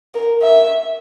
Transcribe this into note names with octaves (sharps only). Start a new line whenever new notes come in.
A#4
E5